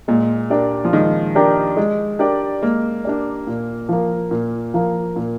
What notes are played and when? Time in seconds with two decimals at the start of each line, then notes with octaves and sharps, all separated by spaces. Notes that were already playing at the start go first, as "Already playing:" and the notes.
0.08 A#2 G#3
0.50 D4 G4 A#4 D5
0.85 F3
0.93 D#3 G#3
1.35 D4 G4 A#4 D5
1.77 G#3
2.19 D4 G4 A#4 D5
2.62 G#3 A#3
3.05 D4 G4 A#4 D5
3.47 A#2
3.89 F3 A#3
4.31 A#2
4.74 F3 A#3
5.16 A#2